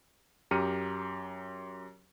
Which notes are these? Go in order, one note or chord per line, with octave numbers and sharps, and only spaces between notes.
F#2 G4 A#5 F6 C#7 D#7